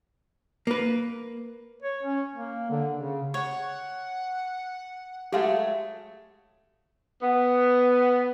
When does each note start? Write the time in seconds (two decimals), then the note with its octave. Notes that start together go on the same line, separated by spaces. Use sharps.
0.67 A#3 B4
1.82 C#5
2.03 C#4
2.36 A#3
2.71 D3
2.98 C#3
3.34 C#5 F#5
5.32 F#3 G#3 A3 G4 F5 F#5
7.22 B3